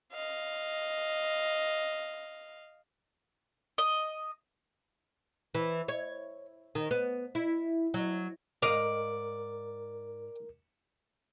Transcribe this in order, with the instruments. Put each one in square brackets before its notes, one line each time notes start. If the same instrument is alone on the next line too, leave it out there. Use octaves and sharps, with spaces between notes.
[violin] D#5 F5
[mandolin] D#5
[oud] E3
C#5
D#3
B3
E4
F#3
[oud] G#2 D#5 F5 [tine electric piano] A#4 [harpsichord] D5